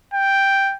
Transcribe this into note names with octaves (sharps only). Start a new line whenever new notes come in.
G5